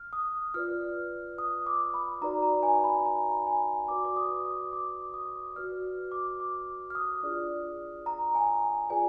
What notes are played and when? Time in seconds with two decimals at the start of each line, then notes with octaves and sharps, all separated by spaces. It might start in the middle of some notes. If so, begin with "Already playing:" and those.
Already playing: F6
0.13 D#6
0.54 F4 B4 D5 F6
1.38 D#6
1.66 D6
1.94 B5
2.22 D#4 F#4 B4 D5 A#5
2.42 A#5
2.63 G#5
2.84 B5
3.05 A#5
3.47 G#5
3.88 F#4 B4 D5 D6
4.05 D6
4.16 D#6
4.45 D#6
4.73 D6
5.14 D#6
5.56 F#4 B4 D5 F6
6.12 D6
6.40 D6
6.90 F6
6.95 D#6
7.23 D4 F4 G#4 D5
8.06 A#5
8.35 G#5
8.90 F4 G#4 B4 D5 G#5